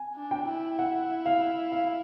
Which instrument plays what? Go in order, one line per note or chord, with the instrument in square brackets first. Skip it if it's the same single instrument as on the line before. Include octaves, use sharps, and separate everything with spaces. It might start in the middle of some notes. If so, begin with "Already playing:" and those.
Already playing: [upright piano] G#5
[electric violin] D4
[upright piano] G5
[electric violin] E4
[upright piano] F#5
F5
F5